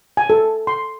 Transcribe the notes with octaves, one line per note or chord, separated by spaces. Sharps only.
G#5
A4
C6